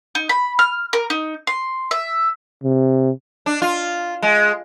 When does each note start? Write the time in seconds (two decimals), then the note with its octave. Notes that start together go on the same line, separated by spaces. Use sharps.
0.15 D#4
0.29 B5
0.59 F6
0.93 A#4
1.10 D#4
1.47 C6
1.91 E5
2.64 C3
3.46 D4
3.62 F4
4.23 G#3